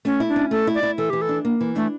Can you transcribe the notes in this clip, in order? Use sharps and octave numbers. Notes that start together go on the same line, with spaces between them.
A3 C#4
E4
D4
C#4
A3 A4
E4
D5
E4
E3 A4
E3 G4
A4
D4
A#3
E3
A3 D4